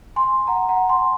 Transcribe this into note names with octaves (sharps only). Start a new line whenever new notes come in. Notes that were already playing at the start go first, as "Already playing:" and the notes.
G#5 C6
F#5 A#5
F#5 A#5
G#5 C6